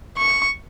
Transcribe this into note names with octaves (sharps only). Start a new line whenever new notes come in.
C#6